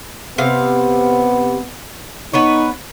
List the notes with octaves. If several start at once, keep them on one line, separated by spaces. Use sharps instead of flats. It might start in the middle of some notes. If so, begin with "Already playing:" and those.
C3 B3 F5
B3 D#4 B4 C#5